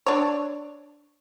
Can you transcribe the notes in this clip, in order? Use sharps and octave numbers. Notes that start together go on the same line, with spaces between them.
D4 C#5